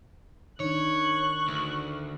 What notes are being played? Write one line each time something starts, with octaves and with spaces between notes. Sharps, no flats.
D#3 D4 C#5 C#6 F#6
D2